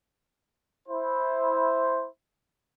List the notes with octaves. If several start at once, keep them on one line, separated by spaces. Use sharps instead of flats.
E4 C5